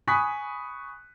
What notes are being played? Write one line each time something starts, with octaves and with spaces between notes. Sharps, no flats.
G#5 B5 C#6 D#6 F#6 B6